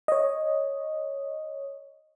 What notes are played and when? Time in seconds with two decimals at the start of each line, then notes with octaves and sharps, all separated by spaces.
0.08 C#5 D#5